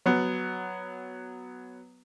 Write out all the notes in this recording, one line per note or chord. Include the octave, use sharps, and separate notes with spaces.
F#3 B3